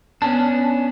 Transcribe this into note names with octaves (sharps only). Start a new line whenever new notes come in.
B3 C#4 D4 A5